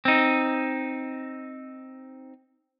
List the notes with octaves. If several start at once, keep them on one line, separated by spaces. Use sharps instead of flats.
C4 D#4